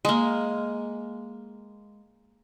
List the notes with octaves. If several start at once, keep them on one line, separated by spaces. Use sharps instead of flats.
G#3 A#3